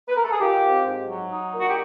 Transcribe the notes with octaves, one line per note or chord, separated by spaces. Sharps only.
B4
A#4
A4
G#4
D#3 F4 G4
C4
G#2
F#3
D#4
A#2
F#4
G4